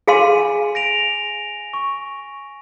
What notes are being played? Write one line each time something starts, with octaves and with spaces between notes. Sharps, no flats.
G#4 F5 G#5 C6 D#7
A#6 D7 F7
C#6